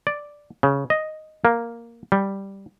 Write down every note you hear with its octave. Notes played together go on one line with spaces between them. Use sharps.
D5
C#3
D#5
A#3
G3